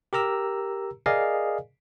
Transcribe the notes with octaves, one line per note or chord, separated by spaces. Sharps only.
G4 A#4 A#5 E6
G#4 A#4 D5 D#5 F5 G#5